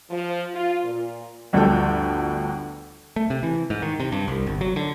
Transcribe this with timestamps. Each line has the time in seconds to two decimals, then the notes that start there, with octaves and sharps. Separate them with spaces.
0.11 F3
0.54 F4
0.84 A#2
1.53 G1 D2 F3 G3 A4 G5
3.16 A3
3.30 C3
3.43 E3
3.70 G#2
3.82 D#3
4.00 C3
4.12 G2
4.28 C2
4.47 G1
4.61 F#3
4.76 D3